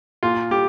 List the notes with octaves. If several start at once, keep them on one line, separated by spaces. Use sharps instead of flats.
A#2 F4
G3 G4